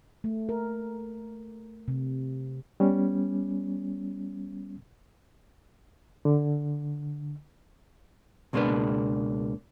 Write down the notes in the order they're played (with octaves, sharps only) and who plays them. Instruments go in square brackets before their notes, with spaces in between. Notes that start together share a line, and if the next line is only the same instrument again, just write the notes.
[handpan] A3
A#4
C3
[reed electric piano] G3 B3 C#4
D3
[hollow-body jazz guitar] C#2 B2 G#3 A#3 D4 B4